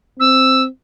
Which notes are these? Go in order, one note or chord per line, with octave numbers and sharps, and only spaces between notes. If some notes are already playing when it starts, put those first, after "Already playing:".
C4 E6